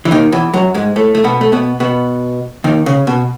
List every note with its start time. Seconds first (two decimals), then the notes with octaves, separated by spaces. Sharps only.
0.05 E3
0.11 D#2 D#3
0.32 E2 E3
0.54 F#2 F#3
0.74 G#2 G#3
0.96 A2 A3
1.15 A3
1.24 B2 B3
1.41 A3
1.52 B2 B3
1.80 B2 B3
2.64 D#2 D#3
2.86 C#3
3.07 B2